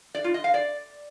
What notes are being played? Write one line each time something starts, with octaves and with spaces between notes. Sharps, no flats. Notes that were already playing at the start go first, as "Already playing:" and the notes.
D5
F4
D#5
F5
D5